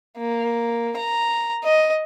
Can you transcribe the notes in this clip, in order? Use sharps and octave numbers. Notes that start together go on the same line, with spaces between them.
A#3
A#5
D#5